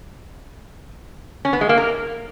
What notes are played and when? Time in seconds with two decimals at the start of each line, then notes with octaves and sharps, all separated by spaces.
1.45 C#4
1.53 B3
1.61 G#3
1.69 A#3
1.77 A#4